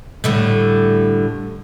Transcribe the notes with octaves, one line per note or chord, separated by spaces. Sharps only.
A2 D3 G3